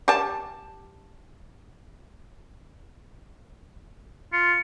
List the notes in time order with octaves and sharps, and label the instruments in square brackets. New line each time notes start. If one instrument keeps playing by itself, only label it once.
[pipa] G4 A5
[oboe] F4 [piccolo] C#7